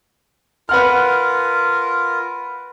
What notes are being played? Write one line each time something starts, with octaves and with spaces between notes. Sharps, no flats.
F4 A#4 B4 F#5 F6